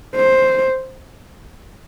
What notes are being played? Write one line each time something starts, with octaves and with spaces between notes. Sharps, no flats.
C5